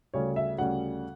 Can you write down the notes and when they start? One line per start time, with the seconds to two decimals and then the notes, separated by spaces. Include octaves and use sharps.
0.14 D2 C#3 G3 C#4 C#5
0.36 E5
0.58 D2 C#3 G3 C#4 F#5